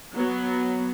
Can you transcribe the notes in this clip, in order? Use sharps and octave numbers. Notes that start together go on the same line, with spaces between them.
F#3 B3